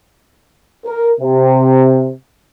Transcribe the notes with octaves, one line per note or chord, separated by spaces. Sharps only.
A#4
C3